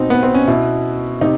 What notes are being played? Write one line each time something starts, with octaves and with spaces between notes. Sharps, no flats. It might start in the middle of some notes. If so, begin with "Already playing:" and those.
Already playing: B2 C4 D#4
B3
C4
C#4
B2 E4
C3 D#4